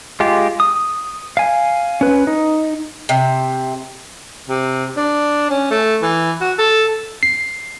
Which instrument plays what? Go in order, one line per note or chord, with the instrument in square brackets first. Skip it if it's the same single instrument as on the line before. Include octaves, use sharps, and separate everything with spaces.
[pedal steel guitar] G#3 F4 G4
D#6
F5 G#5
C#4 B4
D#4
[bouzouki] C3
[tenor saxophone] C3
D4
C#4
A3
E3
F#4
A4
[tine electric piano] C7